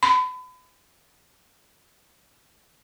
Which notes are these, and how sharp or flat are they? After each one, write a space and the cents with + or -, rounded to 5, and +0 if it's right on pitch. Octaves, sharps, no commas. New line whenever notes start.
B5 +35